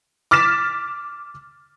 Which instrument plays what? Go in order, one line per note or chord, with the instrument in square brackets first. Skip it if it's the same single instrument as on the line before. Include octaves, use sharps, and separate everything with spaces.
[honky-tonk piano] D6 F6 A6 B6 E7